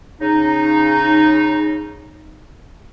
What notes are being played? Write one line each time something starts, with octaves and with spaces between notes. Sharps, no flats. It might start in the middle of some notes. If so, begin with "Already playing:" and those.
C#3 D#4